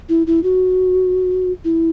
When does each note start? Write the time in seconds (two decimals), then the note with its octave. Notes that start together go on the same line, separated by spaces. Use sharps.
0.09 E4
0.27 E4
0.43 F#4
1.65 E4